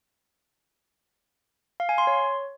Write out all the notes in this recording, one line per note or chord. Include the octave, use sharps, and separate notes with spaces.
F5
G#5
C6
C#5